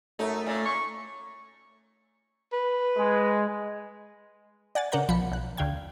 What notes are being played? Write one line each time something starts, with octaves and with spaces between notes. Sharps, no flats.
F#2 A3 D#4
A#2 C#4
C#6
B4
G#3
D5 F#5 G#5 A6
C#3 D4 A#4 F#5 A#5 G6
B1 F3 B5 C#7
B1 F#6
D2 D3 F5 G5 G#6